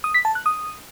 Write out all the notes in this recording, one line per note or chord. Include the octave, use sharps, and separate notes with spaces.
D#6
B6
A5
F#6
D#6